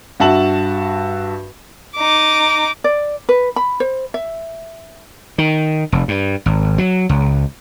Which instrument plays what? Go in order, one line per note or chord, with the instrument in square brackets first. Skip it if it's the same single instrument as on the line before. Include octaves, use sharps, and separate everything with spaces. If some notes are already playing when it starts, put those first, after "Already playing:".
[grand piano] G2 F#4 E5 A5 F#7
[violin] D#4 D6
[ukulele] D5
B4
B5
C5
E5
[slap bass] D#3
F1
G2
G#1
F#3
C#2